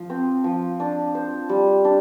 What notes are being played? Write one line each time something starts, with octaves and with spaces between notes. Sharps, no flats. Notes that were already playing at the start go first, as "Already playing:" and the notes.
Already playing: F3
C4
F3
D4
C5
G3
D4